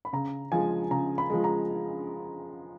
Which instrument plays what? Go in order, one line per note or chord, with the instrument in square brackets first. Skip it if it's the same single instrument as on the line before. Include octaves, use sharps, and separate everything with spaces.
[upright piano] B5
C#3 A#5
F3 G#3 G#5
C#3 A#5
B5
F3 G#3
A#5